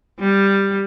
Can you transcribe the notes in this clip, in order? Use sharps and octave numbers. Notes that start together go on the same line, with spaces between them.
G3